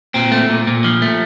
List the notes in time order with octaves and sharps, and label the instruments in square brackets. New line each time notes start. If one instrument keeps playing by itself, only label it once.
[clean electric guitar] A#2 C4
A3
A#2
A#2
F3
A3